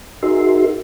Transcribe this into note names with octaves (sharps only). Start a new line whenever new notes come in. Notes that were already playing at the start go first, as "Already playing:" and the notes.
D#4 F#4 G#4 A#4 E5 C6